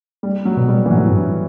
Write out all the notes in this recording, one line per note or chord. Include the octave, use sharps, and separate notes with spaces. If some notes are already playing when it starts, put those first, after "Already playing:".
G3
F#3
B2
G3
E3
A2 F#3
G2